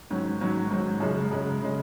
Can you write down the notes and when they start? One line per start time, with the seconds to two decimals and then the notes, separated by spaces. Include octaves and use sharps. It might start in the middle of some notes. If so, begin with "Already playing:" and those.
0.10 G#2 D#3 F#3 C#4
0.40 G#2 D#3 F#3 C#4
0.71 G#2 D#3 F#3 C#4
1.00 F#2 C#3 G#3
1.31 F#2 C#3 G#3
1.62 C#3 G#3